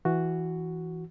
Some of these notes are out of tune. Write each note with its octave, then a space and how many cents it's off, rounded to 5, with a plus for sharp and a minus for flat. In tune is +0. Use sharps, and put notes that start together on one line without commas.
E3 +0 F#4 +0